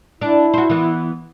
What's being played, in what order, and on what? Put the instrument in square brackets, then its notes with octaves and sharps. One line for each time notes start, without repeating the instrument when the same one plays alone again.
[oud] D4 [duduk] E4
[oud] F#4 C5
E3 B3